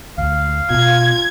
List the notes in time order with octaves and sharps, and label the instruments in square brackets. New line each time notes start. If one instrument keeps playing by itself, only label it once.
[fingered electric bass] D2 [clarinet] F5
[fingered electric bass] B2 [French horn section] F4 [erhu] G#6